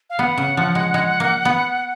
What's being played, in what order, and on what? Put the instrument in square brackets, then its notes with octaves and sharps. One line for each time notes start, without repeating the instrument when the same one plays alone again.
[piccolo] F5
[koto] B3 [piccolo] F#5
[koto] C#3
F3
G#3
G#3
A#3
B3